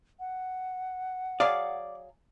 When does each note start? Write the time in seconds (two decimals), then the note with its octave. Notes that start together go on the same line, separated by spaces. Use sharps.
0.20 F#5
1.40 F#3 G#4 D5 F5